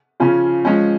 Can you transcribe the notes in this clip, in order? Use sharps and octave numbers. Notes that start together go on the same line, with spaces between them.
C#3 F3 C#4 F4
F3 G#3 C#4